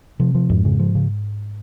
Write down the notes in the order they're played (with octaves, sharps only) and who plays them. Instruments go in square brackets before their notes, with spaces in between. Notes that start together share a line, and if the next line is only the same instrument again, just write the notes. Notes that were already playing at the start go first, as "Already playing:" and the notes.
[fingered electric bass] C3 C4 [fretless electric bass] F3
[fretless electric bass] F3
[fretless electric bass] F2 [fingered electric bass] G#2 G#3
[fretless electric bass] C#3
F3
C#3